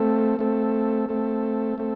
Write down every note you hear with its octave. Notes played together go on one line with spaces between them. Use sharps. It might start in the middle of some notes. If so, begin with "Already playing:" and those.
Already playing: A3 C4 A4
A3 C4 A4
A3 C4 A4
A3 C4 A4